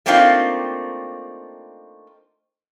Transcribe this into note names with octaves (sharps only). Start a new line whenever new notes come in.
A3 A#3 C4 D4 D#4 F4